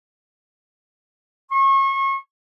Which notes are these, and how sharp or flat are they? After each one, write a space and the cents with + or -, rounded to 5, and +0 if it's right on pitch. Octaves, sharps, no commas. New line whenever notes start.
C#6 -30